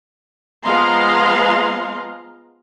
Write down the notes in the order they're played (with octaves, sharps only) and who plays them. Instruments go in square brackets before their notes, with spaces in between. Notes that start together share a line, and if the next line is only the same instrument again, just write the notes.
[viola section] F3 G#3 B3 F5 A#5 C6